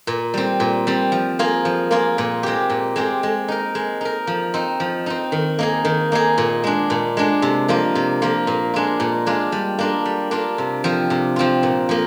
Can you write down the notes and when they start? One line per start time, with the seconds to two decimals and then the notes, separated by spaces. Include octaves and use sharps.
0.07 A#2
0.34 G3 C4
0.60 A#2
0.87 G3 C4
1.12 F3
1.39 A#3 F4 G#4
1.65 F3
1.91 A#3 F4 G#4
2.18 A#2
2.43 G#3 C4 G4
2.70 A#2
2.96 G#3 C4 G4
3.23 G#3
3.48 D#4 A#4
3.75 G#3
4.01 D#4 A#4
4.27 F3
4.54 C4 D#4
4.80 F3
5.06 C4 D#4
5.32 D#3
5.59 A#3 D#4 G#4
5.85 D#3
6.12 A#3 D#4 G#4
6.38 A#2
6.64 G#3 D4
6.90 A#2
7.17 G#3 D4
7.42 C3
7.68 F3 A#3 F4
7.95 C3
8.22 F3 A#3 F4
8.47 A#2
8.74 G#3 D4 F4
9.00 A#2
9.27 G#3 D4 F4
9.52 G3
9.79 A#3 D4 F4
10.05 G3
10.31 A#3 D4 F4
10.58 C3
10.84 F3 C4 F4
11.10 C3
11.36 F3 C4 F4
11.63 A#2
11.89 F3 A#3